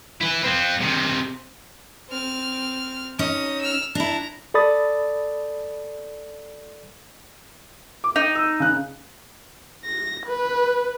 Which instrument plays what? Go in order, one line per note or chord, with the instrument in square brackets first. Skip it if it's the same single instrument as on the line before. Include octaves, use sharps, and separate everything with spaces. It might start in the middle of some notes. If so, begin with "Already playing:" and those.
[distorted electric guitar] E4 B4
F3 C4
C3 D#3
[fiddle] C4 F6
[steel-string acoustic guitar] C#4 D#4 [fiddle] D#6
[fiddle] E6 F6
[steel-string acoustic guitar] D4 E4 [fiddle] A#5
[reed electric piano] A4 D5 B5 D#6 A6
[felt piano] D6
[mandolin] D#4
[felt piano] E6
C#3 F#6
[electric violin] A#6
B4